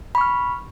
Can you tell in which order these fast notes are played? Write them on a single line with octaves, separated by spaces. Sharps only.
B5 C#6 F6